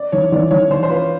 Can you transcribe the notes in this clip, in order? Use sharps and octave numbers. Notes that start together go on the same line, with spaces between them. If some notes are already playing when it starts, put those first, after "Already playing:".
Already playing: D5
E3 C#5
E3 D5
E3 C#5
E3 C5
C5
F4 B4